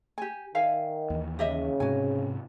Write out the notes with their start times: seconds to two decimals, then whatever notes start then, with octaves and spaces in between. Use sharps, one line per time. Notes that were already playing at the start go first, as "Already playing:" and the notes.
0.18 G4 G#5
0.55 D#3 E5 F5 G#5
1.10 D#2 E3
1.39 C#3 G4 D#5 E5
1.80 G#2 C3 F#4 G#5